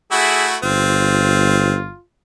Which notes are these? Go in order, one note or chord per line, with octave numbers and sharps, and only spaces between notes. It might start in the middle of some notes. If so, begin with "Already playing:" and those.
A3 E4 F#4 G#4
G1 C4 F4